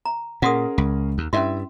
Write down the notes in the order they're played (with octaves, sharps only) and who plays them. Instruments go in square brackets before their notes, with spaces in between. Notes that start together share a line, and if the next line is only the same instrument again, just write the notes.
[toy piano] A#5
[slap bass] A#2 [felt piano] C#4 G#4 A#4 [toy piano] F#5 C6 D#6
[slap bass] C#2
D#2
[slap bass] G2 [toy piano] C#4 C6 [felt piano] E4 E5